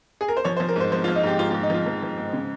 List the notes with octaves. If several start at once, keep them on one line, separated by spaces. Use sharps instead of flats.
G#4
A#4
C5
F3 C#5
C5
F3
A#4
G#2 C5
F3 C5
F4
F3
D#4
G#2 G4
G#2 F4
F4
G#2
D#4
F3 F4
F3
F3
G#2
C#3